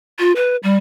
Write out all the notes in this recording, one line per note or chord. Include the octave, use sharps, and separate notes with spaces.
F4
B4
G3